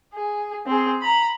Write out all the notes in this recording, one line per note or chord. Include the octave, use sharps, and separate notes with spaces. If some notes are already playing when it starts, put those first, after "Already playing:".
G#4
C4 G#4
A#5 B5